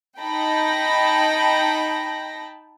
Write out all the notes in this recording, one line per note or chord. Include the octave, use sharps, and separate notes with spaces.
D#4 G5 A5 B5 A#6